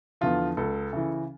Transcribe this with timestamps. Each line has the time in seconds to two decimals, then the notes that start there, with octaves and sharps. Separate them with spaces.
0.21 E2 D3 F3 F4
0.57 C#2 A4
0.93 C#3 E3